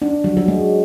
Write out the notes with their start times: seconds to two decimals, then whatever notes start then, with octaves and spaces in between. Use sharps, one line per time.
0.02 D4
0.24 F#3
0.37 F#3
0.48 G#3